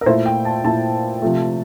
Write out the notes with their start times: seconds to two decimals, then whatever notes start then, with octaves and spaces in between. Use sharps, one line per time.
0.01 A#4
0.06 A#2 A3 E4 C5
0.26 G5
0.45 A5
0.64 A#2 A3 E4 A5
1.22 C3 F3 A3